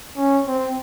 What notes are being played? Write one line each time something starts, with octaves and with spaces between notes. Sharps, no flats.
C#4
C4